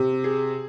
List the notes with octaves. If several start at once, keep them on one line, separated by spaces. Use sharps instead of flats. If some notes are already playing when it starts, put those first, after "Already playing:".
Already playing: C3
G#4